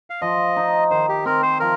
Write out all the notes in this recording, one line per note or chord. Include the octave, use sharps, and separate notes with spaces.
F5
F3 D#5
D#4
D#3 C5
G4
C4 A#4
C5
F3 A#4